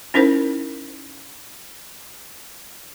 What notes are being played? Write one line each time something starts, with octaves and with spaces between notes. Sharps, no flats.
C#4 D#4 E4 A#4 C5